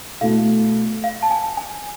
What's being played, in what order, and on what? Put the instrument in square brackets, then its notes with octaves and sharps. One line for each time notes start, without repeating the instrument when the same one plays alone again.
[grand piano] B2 A3 E4 A4 [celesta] F5
[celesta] F5
A5
G#5
G#5